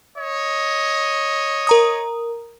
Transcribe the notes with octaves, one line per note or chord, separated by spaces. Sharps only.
C#5 D#5
A#4 A#5 D#6